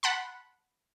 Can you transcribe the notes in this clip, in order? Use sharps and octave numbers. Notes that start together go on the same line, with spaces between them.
F#5 A5 B5 C6